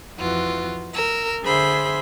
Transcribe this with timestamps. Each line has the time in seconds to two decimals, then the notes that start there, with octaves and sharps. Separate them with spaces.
0.18 F2 E3 F4 F#4
0.94 A#4 E6
1.43 D3 G#4 C5 E5 B5 C6